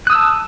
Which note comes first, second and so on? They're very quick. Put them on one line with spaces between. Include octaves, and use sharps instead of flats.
F#6 D#6 E6 A5